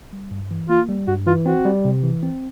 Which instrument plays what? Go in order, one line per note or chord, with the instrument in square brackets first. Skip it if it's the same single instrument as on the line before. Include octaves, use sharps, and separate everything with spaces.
[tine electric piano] G3
G2
E3
[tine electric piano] A#3 [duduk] F4
[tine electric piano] G3
[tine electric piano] G2 [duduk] F#4
[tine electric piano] E3 [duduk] F4
[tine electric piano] C4 [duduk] F#4
[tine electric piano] G3
C3
E3
C4